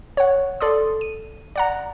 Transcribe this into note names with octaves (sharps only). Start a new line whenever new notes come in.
C#5 F#5
A4 D5 C6 D#6
D#7
D5 F#5 A#5